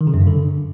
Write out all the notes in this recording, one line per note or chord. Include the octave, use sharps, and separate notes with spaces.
D#3
C#3
F#2
G2
D3